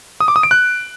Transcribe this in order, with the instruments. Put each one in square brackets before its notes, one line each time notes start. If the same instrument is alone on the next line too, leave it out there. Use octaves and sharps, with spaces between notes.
[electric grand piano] D#6
D6
D#6
D7
F#6